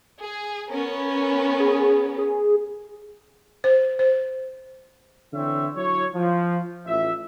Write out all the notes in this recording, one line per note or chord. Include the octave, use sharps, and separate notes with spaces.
G#4
B3 C#4 A#4
G#4
G#4
C5
C5
D3 E3 C4 C#5 E5
F#3 E4 C#5
F3
A1 F4 E5